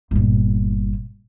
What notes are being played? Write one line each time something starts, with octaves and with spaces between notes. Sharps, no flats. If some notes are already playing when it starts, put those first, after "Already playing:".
G1 A#2